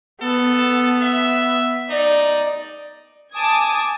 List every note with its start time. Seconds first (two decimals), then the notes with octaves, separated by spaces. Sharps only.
0.22 B3 A4
1.02 E5
1.90 D#4 D5
3.34 G#5 A5 D6 D#6 G#6